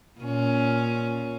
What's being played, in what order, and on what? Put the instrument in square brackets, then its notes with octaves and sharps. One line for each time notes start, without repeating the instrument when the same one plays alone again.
[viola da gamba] A#2 C#4